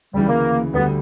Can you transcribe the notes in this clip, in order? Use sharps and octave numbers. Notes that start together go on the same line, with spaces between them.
D2 C#3 E3 G3
A#3
D2 D3 G3 B3